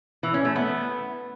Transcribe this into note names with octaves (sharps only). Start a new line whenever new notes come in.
E3
C#4
A3
B3